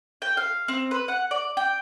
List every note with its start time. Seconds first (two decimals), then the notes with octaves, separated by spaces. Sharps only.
0.22 G5
0.37 F5
0.68 C4
0.91 B4
1.08 F#5
1.31 D5
1.57 G5